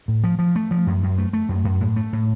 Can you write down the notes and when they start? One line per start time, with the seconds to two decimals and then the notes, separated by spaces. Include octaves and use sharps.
0.08 A2
0.24 F3
0.39 F3
0.56 A3
0.71 F3
0.87 F#2
1.03 F#2
1.18 A3
1.33 A3
1.49 F#2
1.64 F#2
1.80 A2
1.96 A3
2.13 A2